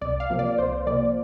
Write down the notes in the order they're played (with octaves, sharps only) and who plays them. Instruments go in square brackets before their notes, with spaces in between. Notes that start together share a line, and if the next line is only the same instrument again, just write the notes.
[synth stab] C2 D5
F5
C3 F3 A#3
D5
C2 C5
C3 F3 A#3 D5